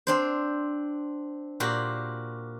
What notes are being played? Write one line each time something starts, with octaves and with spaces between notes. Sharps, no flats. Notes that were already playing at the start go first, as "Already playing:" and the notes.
C4 D4 C5
A#2 F#4 G4 C6